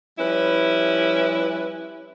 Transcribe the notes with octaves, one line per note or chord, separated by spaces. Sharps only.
F3 G3 C#4 E4 B4